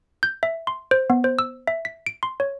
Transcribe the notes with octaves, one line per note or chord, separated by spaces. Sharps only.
G6
E5
C6
C5
B3
C5
E6
E5
B6
D7
C6
C#5